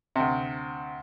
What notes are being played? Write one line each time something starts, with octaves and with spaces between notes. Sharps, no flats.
D2 C3